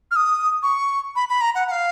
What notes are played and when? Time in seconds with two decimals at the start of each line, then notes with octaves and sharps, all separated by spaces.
0.11 F6
0.16 D#6
0.63 C#6
1.16 B5
1.29 B5
1.41 A#5
1.55 F#5
1.68 F#5
1.71 F5